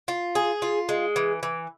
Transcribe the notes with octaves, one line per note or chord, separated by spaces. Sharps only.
F4
G#4
F4
G#3
E3
E3